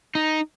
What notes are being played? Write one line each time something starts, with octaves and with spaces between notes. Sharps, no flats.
D#4